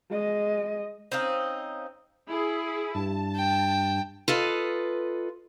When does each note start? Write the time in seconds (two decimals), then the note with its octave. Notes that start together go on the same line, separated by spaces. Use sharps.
0.11 G#3 D#5
1.12 C4 C#4 D#4 F5
2.27 E4 G#4
2.95 G2 A5
3.35 G5
4.28 F4 A4 B4 D#5